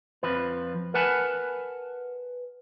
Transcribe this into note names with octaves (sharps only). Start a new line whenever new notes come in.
F2 F3 B4
A#4 B4 F#5 G#5 A5 B5